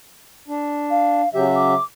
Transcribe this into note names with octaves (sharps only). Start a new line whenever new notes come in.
D4
F5
C#3 F#3 G4 E5
D6